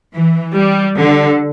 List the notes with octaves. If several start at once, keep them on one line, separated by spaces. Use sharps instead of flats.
E3
G3
D3